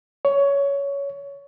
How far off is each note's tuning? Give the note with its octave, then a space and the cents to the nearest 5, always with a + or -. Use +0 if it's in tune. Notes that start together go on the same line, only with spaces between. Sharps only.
C#5 +15